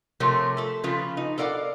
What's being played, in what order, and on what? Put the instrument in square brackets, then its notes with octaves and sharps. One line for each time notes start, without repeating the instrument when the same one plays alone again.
[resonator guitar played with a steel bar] C3 F3 A3 C4 A#4 C#5
A3 A4
C#3 F3 F4 B4
D#4
A4 A#4 D5 F5 F#5